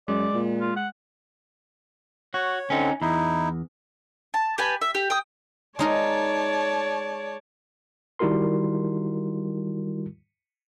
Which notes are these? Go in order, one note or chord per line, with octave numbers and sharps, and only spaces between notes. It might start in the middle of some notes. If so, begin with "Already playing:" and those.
F#2 G#3 D5
A#2
F4
F#5
F#4 C#5
D3 C4 C#4 D#4
E2 D#4 E4
A5
G4 B4 G#5 A5
E5
G4
G5 D#6
G#3 D#4 A#4 C#5 D5 A5
D#3 G3 E4 F#4 A#4 C6